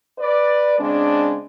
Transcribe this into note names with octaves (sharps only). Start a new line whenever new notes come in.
B4 D5
C#3 G#3 C4 D4